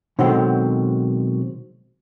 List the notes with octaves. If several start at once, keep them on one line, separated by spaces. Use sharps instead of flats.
B2 D3 D#3 F#3 G#3 C4